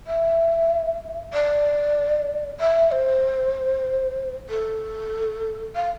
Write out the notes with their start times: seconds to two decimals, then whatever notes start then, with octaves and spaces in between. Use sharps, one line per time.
0.07 E5
1.33 D5
2.60 E5
2.92 C5
4.49 A4
5.76 F5